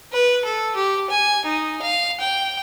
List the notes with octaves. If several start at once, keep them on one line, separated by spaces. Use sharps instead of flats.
B4
A4
G4
G#5
D#4
F5
G5